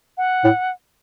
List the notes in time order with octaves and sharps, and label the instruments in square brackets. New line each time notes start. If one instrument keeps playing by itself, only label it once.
[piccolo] F#5
[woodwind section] A2